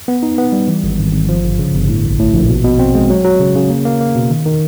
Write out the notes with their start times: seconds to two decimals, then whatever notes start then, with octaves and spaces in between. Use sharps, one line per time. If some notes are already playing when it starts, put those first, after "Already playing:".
0.08 B3
0.23 D#4
0.38 B3
0.53 G3
0.68 E3
0.83 G#1
0.99 G#1
1.13 G#1
1.29 F3
1.43 G1
1.59 C#3
1.74 G1
1.88 A2
2.05 A#1
2.19 A2
2.34 A#1
2.49 B2
2.64 B2
2.79 C4
2.95 G#3
3.10 F#3
3.24 F#3
3.40 C#3
3.55 C#3
3.70 A#3
3.85 A#3
4.01 A#3
4.15 B2
4.30 D#3
4.45 D#3